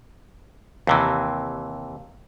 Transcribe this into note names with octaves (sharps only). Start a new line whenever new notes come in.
D#2 C3 E3